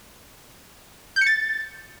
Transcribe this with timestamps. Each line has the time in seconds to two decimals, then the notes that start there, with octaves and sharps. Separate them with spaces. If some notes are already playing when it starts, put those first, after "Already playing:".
1.16 G6
1.21 C#7
1.27 A6